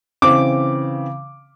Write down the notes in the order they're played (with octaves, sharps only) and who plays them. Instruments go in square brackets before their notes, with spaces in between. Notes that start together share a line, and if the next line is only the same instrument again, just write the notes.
[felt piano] C#3 E3 C4 [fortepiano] D6